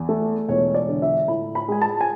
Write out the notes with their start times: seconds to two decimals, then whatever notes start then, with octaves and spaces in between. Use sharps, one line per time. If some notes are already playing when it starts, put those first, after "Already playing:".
Already playing: E2
0.09 A3
0.49 E1 C#5
0.74 D5
0.88 D3
1.02 E5
1.28 A2 B5
1.55 B5
1.68 G#3 G#5
1.82 A5
2.01 G#5